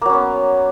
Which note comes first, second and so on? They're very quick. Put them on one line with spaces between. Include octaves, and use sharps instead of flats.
A#3 F#3 C#4 B3